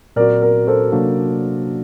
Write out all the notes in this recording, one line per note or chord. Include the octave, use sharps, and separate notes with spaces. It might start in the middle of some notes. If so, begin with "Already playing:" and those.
A#2 F#3 C4 F#4 A#4 D5
A#4
A4 C5
C3 F#3 A#3 D4 F#4